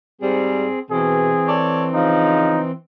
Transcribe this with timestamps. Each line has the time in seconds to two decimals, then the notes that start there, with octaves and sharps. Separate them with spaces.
0.22 G#2 G3 C4 G#4
0.90 B2 E3 C4 G#4
1.47 A4 C#5 D5
1.94 C#3 F3 D#4